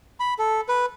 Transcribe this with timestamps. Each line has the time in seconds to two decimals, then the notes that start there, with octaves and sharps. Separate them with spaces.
0.20 B5
0.39 A4
0.69 B4